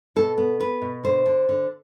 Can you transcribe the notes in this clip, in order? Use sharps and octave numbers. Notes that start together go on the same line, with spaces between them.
B2 A4
B3
B3 B4
B2
D3 C5
D3
D3